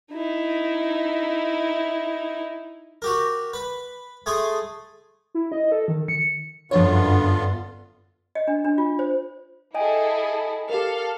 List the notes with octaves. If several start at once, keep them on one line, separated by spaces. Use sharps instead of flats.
D#4 E4
F#4 G4 A#4
B4
A3 G#4 G#5 C6 D#6
E4
D#5
A4
D#3
C#7
G1 F#2 D3 F3 B3 F4 C#5
D#5
D4
D4
F4
C5
E4 G#4 A4 D#5 G5 G#5
G4 A4 A#4 F5